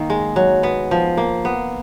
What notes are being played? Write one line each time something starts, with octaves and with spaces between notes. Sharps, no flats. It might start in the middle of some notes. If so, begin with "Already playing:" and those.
Already playing: D#3 A#3
G#3
F#3
B3
F3
A#3
B3